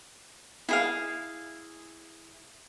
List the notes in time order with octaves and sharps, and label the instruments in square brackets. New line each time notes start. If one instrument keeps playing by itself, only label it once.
[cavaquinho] E4 G#4 F5